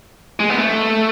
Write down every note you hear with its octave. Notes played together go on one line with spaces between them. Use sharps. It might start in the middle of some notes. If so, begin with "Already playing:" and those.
G#3
B3
A3